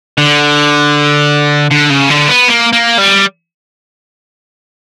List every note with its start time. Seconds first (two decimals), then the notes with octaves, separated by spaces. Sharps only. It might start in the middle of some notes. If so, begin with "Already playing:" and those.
0.18 D3
1.71 D3
1.90 C#3
2.10 D3
2.28 B3
2.48 A#3
2.73 A#3
2.98 G3